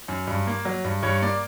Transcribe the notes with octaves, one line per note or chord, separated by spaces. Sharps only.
F#2
G2
A#3
F#3
G2
G2 C#5
A#3 D5